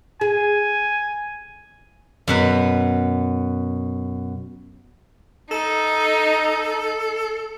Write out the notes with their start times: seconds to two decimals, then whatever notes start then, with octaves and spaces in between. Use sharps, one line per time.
0.21 G#4 G#5
2.28 F#2 B2 B4
5.51 D#4 A4